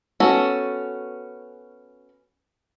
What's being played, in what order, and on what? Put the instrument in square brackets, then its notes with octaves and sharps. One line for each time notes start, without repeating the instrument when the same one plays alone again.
[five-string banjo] B3 C#4 F#4 A4